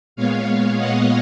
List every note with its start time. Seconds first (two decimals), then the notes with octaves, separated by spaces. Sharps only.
0.16 A#2 G#3 B3 C#5 F5
0.78 D#5 F#5